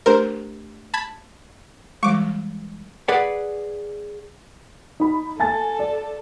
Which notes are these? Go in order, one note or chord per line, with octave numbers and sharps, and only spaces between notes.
A3 D4 G4 A#4 C5
A5 B5 G#6
E3 G3 G#3 C#6 D6
G#4 B4 D5 F#5
D#4 B5
A4 G#5 A5 A6
D5